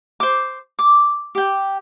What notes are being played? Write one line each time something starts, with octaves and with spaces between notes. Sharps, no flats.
C5 D6
D6
G4 G5